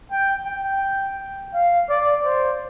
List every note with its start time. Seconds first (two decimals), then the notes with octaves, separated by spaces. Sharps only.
0.11 G5
0.47 G5
1.54 F5
1.89 D5
2.24 C5